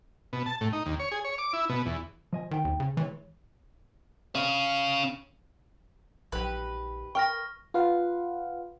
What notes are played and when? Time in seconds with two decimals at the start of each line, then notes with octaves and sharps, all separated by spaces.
0.33 B2
0.46 A5
0.61 A2
0.73 D#4
0.86 D#2
1.00 C#5
1.12 G#4
1.25 C#5
1.38 D6
1.53 E4
1.69 B2
1.86 E2
2.33 F3 D#5 G#5
2.51 D#3 D#4 G5
2.65 D#2
2.80 C#3
2.97 D#3 E3 G#3 C#5
4.35 C#4 F5
6.32 A#1 D#3 F#3 G4 B4
7.15 A#4 G5 C#6 F6 A#6
7.74 F4 B4 F5 F#5